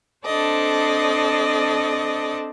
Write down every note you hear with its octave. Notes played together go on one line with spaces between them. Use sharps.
C4 D4 A4 C5 D5 D#5